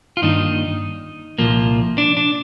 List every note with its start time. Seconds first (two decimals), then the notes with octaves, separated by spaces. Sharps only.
0.17 F4
0.22 G2 D#3 A#3 D4 D#4
1.38 C2 A#2 F3 A#3
1.98 D4
2.17 D4